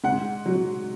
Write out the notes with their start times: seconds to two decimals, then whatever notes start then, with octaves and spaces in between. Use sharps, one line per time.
0.04 G#2 F#5
0.46 F#3